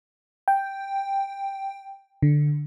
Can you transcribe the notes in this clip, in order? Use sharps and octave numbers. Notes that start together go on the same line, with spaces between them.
G5
D3